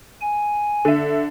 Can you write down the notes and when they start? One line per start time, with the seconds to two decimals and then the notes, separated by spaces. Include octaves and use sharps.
0.21 G#5
0.85 D3 E5